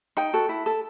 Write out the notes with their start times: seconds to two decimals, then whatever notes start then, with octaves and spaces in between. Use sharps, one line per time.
0.17 D#4 G5
0.33 F#4 A4
0.49 E4
0.66 A4